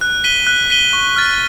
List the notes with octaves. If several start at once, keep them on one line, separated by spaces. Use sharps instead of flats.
F#6
B6 D#7 G7
F#6
B6 D#7 G7
C#6
F6 A6